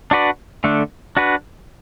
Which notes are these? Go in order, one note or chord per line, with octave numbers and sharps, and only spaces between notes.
D4 F#4 B4 D5
D3 A3 D4
D4 F#4 B4